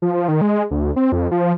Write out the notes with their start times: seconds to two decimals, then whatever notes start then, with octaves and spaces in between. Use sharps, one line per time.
0.02 F3
0.28 D#3
0.41 G#3
0.71 D2
0.96 C4
1.12 F2
1.31 F3